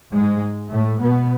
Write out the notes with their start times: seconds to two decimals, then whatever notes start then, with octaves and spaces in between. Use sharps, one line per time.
0.13 G#2 G#3
0.71 A2 A3
1.01 B2 B3